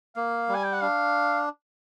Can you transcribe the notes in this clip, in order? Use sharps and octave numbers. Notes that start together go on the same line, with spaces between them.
A#3 F5
G3
G#5
G5
F#5
D4 F5